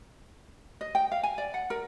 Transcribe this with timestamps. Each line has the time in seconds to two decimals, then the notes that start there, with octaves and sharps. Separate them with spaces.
0.81 D#5
0.95 G5
1.12 F5
1.23 G#5
1.38 D5
1.54 F#5
1.70 A#4